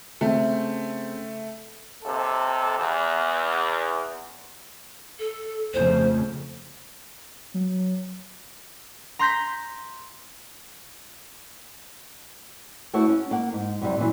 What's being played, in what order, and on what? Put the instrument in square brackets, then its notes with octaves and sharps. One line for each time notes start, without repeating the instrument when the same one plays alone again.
[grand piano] C#3 C4 [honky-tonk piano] A3
[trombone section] D#2 C3 A4
E2
[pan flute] A4
[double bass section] F2 C#3 A3 [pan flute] C5
[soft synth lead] F#3
[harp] A#5 C6 G6 A#6 B6
[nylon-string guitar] A3 E4 F#4 C#5
C#4
A#3 F#5
G#2
F#2 C3 G3
A#2 D3 E3 F#3